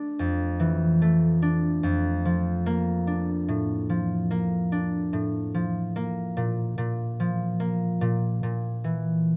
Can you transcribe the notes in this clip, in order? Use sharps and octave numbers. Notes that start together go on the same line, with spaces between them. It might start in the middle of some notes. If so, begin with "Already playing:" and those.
Already playing: A3 D4
F2
E3
A3
D4
F2
F3
A#3
D4
A2
F3
A#3
D4
A2
F3
A#3
A#2
A#2
F3
A#3
A#2
A#2
E3